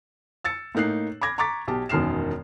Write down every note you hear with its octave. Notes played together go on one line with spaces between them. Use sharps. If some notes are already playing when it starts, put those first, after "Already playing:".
E6 A6 C#7
A2 A#3 D#4 F#6 C7
B5 D6 G#6 A#6
A#5 C#6 D6 A6 B6
B1 G4 A5
E1 F#2 D#3 F6 C7 E7